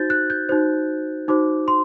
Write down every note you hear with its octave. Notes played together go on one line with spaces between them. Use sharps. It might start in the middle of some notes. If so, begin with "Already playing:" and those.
Already playing: D#4 F#4 C5 G6 A6
F#6
G6
D#4 F#4 C5
D#4 F#4 C5 D6
C6